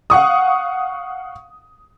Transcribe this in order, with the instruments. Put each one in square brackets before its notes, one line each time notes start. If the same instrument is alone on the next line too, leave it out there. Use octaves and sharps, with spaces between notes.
[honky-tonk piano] F5 F#5 C#6 D#6